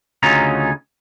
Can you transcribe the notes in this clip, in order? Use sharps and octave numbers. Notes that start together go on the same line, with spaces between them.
D2 C#3 C#4 D#4 F4 A#5